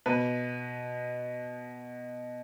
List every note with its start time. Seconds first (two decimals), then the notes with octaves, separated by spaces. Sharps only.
0.06 B2 B4